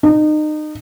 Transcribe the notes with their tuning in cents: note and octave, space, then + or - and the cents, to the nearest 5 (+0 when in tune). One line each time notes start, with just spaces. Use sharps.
D#4 -30